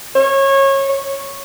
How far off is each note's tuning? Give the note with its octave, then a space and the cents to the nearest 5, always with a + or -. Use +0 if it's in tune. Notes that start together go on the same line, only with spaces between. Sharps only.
C#5 -25
C#5 -10